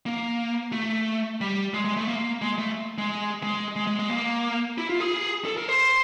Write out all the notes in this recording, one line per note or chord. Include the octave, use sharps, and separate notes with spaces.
A#3
A3
G3
G#3
G#3
A3
A#3
G#3
A3
G#3
G#3
G#3
G#3
G#3
A#3
E4
F4
G#4
A4
A#4
C5